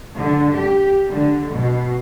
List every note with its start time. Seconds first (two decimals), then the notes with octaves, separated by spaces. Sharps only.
0.18 D3
0.56 G4
1.08 D3
1.51 B2